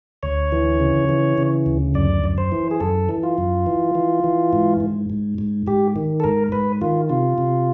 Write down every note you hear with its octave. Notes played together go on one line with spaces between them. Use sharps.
D2 C#5
E3
C#3
E3
C#3
D2
F#2 D5
F#2
C5
E3
G#4
F#2 A4
E3
F4
F#2
E3
E3
E3
G#2
G#2
G#2
G#2
G#2 G4
D#3
A4
G#2 A#4
G#2 B4
D#3 F4
C3 F4
C3